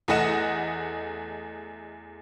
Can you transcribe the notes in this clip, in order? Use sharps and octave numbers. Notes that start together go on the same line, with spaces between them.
E2 A3 D#5 F#5 E7